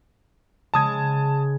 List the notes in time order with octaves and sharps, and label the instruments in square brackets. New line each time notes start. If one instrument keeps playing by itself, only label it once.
[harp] C#3 G#3 [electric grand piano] A5 D#6 G#6